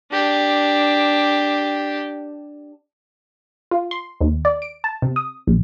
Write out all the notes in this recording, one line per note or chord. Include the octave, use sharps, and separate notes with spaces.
D4 G4
F4
C6
D#2
D5
D7
A5
C3
D#6
A#1